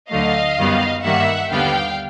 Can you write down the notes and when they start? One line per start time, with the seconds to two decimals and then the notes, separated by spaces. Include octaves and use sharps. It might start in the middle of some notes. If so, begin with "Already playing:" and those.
0.10 D2 D3 F#3 A3 D#5 F5
0.58 F#2 D#3 G3 B3
1.04 G2 D#3 G3 A#3 E5 F#5
1.51 D#2 D3 G3 B3 F5 G5